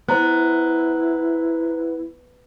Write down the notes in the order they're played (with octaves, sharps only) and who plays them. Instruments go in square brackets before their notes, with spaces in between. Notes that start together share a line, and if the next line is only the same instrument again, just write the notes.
[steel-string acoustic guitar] B3 [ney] E4 [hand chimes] C5 A#5 F#6